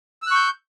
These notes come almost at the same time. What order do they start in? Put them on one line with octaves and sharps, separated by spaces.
E6 F#6 C#6 G6